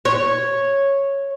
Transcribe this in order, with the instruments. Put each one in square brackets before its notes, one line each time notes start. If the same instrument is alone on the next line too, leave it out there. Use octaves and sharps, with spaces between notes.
[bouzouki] C#5